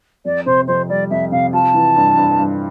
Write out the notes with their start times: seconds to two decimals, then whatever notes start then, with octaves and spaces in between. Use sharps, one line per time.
0.25 F2 D5
0.46 C3 C5
0.67 F2 C5
0.89 G3 D5
1.10 F2 E5
1.32 C3 F5
1.53 F4 A5
1.74 E3
1.96 G2
2.17 G2
2.39 G2